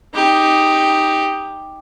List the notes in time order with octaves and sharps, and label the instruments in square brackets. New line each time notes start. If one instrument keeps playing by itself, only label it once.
[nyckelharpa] D#4 G4